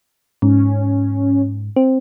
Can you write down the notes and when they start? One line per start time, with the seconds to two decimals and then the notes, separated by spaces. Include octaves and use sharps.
0.42 G#2 C#4
1.76 C4